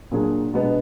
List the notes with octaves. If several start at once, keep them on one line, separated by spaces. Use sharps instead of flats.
A#2 F#3 D4 G#4
B2 G#3 B3 D4